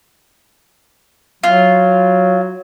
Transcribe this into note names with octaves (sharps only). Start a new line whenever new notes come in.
F#3 F4